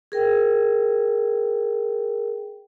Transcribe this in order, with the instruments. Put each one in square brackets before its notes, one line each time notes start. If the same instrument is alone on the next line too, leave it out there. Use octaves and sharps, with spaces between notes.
[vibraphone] G#4 A#4 G5